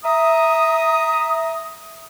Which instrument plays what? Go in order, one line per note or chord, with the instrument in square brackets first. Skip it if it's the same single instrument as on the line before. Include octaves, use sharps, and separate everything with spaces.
[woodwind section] E5 A#5 D#6